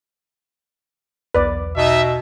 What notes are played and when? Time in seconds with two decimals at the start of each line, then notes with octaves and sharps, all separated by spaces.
1.34 B1 E2 B4 D5
1.77 B2 D#4 E5